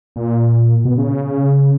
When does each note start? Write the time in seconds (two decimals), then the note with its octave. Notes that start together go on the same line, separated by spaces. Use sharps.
0.16 A#2
0.85 B2
0.98 C#3